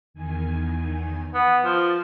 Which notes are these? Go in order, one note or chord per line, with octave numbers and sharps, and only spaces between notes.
E2 D#3 G#5
B3
F3 C6 F6 A6